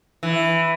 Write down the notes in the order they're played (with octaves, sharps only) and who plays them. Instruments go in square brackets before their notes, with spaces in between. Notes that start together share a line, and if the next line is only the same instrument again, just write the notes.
[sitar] E3